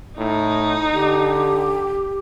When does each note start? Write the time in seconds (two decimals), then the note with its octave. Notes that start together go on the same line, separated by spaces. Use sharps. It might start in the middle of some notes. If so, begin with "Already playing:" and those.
0.18 A2 D#4
0.94 D3 G4